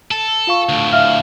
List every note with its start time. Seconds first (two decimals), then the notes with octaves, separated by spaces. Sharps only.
0.11 A4
0.47 F4 F5 C#6
0.69 D2 A2
0.92 E5 F5 F6